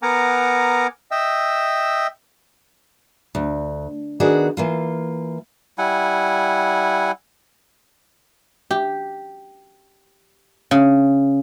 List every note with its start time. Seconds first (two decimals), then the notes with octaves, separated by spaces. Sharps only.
0.03 B3 A#4 F#5 G#5 A#5 D6
1.11 D#5 E5 G5 E6
3.35 D2
4.20 D#3 B3 D4 F#4 G#4
4.57 E3 A#3 F4
5.78 G3 E4 F#5 G#5
8.71 G4
10.71 C#3